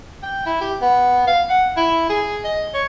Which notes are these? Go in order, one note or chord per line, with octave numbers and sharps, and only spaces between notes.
G5
E4
G4
B3
F5
F#5
E4
G#4
D#5
C#5